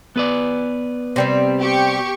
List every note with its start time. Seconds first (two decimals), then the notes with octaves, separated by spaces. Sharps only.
0.16 B3 B4 D5
1.16 C3 G3 C4
1.60 G4 C#6